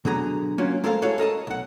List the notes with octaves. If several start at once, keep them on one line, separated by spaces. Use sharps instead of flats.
B2 D3 F#3 G#4 A#5
F#3 A#3 C#4 F4
G#3 A4 A#4 C5 D5 F5
E4 F#4 G#4 A4 C#5 F5
A4 A#4 D#5 A5
B1 F#5